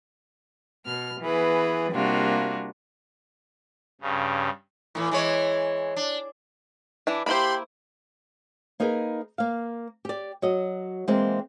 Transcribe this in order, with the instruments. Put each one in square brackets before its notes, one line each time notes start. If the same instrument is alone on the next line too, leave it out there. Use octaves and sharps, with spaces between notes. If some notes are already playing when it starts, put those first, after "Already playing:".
[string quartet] B2 F6
E3 B3 G#4 B4
C3 G3 A#3 D4 F4 F#4
[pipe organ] G2 C#3
[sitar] A2 E3
E3 G#3 C#5
D4
[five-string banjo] E3 D4 E4
[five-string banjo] A#3 E4 C5 [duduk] G4 [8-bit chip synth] B5 C6
[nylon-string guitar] A#3 D#4 G#4 A#4 B4
A#3 F5
G4 D5
F#3 F#4 D#5
E3 G#3 A#3 C4